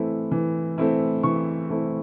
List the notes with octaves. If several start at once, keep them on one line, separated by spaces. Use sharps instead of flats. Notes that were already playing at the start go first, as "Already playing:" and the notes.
Already playing: E3 A3 C4 E4
E3
A3 C4 E4
E3 C#6
A3 C4 E4